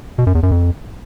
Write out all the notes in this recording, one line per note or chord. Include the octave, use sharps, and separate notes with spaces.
B2
F#2
E2
F#2
F2